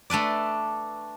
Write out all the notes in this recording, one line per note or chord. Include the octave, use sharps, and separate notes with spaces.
A3 D4 B4 D5